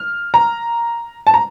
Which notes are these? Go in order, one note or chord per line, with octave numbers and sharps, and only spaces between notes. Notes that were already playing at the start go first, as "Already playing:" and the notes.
Already playing: F6
A#5
A5
A#5